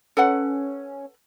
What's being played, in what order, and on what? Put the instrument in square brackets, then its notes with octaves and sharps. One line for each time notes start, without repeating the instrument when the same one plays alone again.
[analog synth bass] C#4 [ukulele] A4 B4 F#5